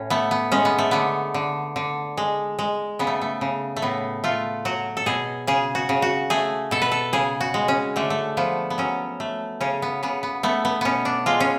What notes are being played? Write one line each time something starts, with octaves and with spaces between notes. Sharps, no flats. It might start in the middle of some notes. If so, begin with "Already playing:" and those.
Already playing: A2 C#4
A3 B3
B3
G#3 C#4
B3
A3
D3 B3
D3
D3
G#3
G#3
C#3 B3
A3
A3
C#3
A3
A2 B3
A3 F4
F#3 F#4
A4
B2 G#4
C#3 G#4
F#4
C#3
F#4
A3 G#4
B2 A4
B4
A4
C#3 G#4
F#4
G#3
C#4
D3 A3
A3
F3 B3
B3
F#3 C#4
A3
C#3 C#4
B3
C#3 B3
B3
A3 B3
B3
B2 B3 C#4
D4
G#3 F4
C#4